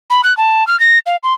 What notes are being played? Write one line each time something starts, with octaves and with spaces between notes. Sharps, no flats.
B5
F#6
A5
F6
A#6
F5
C6